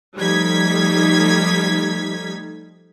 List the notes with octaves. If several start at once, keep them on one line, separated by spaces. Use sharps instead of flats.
F3 G3 A3 D#4 G#6 B6